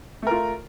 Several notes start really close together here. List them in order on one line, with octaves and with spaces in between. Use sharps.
A3 A#4 F4